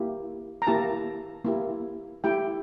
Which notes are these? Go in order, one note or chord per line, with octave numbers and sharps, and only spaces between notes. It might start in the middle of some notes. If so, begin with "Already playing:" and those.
Already playing: A#3 E4 G4
A#5
A#3 E4 G4 A5
A#3 E4 G4
A3 E4 G4 G5